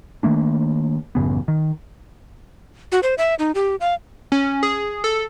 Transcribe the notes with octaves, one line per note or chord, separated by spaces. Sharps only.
D#3 A3 A#3 D4
A1 F#2 C#3 B3
D#3
F#4
C5
E5
D#4
G4
F5
C#4
G#4
A4